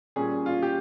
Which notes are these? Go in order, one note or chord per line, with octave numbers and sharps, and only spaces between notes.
A#2 G3 C#4 G#4
F4
G4